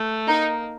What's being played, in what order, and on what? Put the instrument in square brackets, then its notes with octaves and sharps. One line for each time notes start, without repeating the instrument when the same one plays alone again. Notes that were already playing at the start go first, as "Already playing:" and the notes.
Already playing: [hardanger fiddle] A3
[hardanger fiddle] A#3 [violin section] D#4